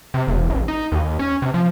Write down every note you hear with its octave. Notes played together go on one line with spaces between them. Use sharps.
C3
E1
A1
D#4
D#2
C#4
C3
F3